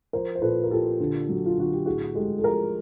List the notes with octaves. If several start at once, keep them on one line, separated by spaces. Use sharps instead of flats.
F3 A#4 C5
C5
A#2 A4 B4
A#4
A#2 G4 A4
D3
F#3
F4
D3 F#4
G4
A2 F#4 G#4
G#3 G4 A4
A4
F3 G#4 A#4